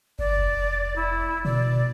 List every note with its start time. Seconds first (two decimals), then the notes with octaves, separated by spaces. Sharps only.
0.19 G1 D5
0.39 F1
0.96 E4
1.45 B2 D5